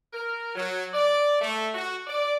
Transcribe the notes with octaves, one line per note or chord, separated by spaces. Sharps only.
A#4
F#3
D5
A3
F#4
D5